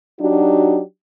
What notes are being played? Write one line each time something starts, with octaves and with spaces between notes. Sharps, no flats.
F#3 D4 D#4 F#4 G4